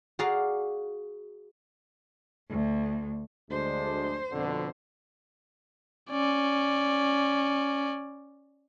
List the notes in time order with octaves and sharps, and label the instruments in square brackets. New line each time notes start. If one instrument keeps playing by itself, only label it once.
[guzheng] F#4 G#4 D5 F5 A#5
[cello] D2
[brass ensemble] D2 G#3 D4 [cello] C5
[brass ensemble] F2 B2 D3
[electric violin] C#4 D5